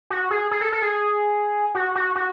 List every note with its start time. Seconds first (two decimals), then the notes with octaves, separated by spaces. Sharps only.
0.10 F#4
0.31 G#4
0.51 G#4
0.61 A4
0.72 A4
0.82 G#4
1.75 F#4
1.95 F#4
2.15 F#4